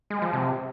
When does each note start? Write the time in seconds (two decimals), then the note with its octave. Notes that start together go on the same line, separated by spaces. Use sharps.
0.10 G#3
0.22 F3
0.33 C3